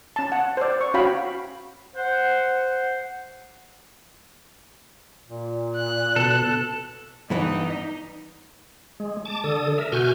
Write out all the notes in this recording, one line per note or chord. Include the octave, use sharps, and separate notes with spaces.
C#4 A5
F#5
C5 D5
C#6
C#4 F#4 C#5 F5 G5 B5
C5 F#5
A#2
F#6
B2 A4
G2 E3 B3 D#4
G#3
A5 D6
D3 A4 D#6
A#4 E5
B2 F#4 G#5 F6 G6